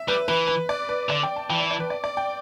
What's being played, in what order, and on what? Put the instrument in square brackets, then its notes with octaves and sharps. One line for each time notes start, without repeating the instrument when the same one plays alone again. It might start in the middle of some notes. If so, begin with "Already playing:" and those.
Already playing: [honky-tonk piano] E5
[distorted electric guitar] G3 [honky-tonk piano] B4
[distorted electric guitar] E3 [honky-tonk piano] B4
[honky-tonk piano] B4
D5
B4
[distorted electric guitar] D3 [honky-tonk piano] D5
[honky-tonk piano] G5
A5
[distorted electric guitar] E3 [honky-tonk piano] G5
[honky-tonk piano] D5
D5
B4
D5
D5
G5